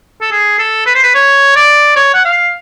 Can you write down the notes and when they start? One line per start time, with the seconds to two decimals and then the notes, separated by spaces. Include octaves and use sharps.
0.22 A4
0.32 G#4
0.59 A4
0.86 B4
0.95 C5
1.04 B4
1.15 C#5
1.56 D5
1.96 C#5
2.14 F#5
2.25 F5